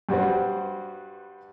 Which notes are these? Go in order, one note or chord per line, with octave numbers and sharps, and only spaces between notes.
G2 G3 F#4 B4 C5